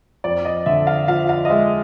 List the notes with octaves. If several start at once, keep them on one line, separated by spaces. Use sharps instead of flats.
F2 D5
D#5
D3 E5
F5
F3 F5
F5
D#5
G#3 E5